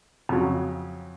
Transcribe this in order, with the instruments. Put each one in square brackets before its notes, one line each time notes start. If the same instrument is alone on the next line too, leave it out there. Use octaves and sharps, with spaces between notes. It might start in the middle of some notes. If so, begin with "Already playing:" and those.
[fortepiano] F2 C#3 F#3